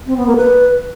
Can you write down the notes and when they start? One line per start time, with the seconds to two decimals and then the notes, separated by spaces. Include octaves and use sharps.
0.07 C4
0.17 B3
0.27 A#3
0.36 B4